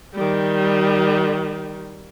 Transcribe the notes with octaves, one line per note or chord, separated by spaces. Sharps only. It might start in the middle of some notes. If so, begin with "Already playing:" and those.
D#3 G3